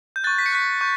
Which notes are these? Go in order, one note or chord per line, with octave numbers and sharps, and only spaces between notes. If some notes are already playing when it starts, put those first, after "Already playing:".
G6
C#6 F#6 A6
B6
C#7
C#6 F#6 B6
C#6 G6